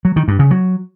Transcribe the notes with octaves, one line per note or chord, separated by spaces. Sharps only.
F#3
D#3
G2
C#3
F#3